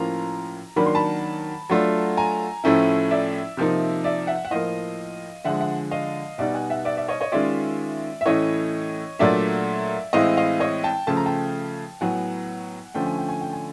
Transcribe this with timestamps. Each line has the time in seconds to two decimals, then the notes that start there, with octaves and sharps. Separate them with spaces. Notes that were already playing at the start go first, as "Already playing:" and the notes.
Already playing: A2 F3 A#3 C#4 F4 A#5
0.76 D#3 F#3 A#3 D4 B5
0.86 C6
0.95 A5 B5
1.70 F#3 A3 D4 F4
2.17 G#5 A#5
2.64 A2 F3 A3 C#4 E4
3.11 D5 E5
3.57 C3 F3 A#3 D#4
4.04 D5 E5
4.27 E5 F#5
4.45 F#5
4.51 A2 F3 A#3 D#5 F5
5.45 D3 F3 G#3 E5 F#5
5.60 E5 F#5
5.91 D#5 F5
6.38 B2 G3 B3 D#4 D5 E5
6.54 F#5 G#5
6.70 E5 F#5
6.85 D5 E5
6.97 D5 E5
7.08 C#5 D#5
7.21 C#5 D#5
7.32 D#3 G#3 C#4 F4 D5 E5
8.21 E5
8.26 A2 E3 A3 C#4 C#5 D#5
9.19 A#2 F#3 A3 D4 D5 E5
10.13 A2 E3 G#3 C4 E4 D#5 F5
10.37 D#5 F5
10.60 C#5 D#5
10.84 G5 A5
11.07 C#3 F3 A3 A5
11.17 A#5
11.26 G5 A5
12.01 A2 F#3 B3 F#5 G#5
12.94 D3 F3 A3 C#4 G5
13.06 G#5
13.18 G5
13.29 G#5
13.41 G5
13.53 G#5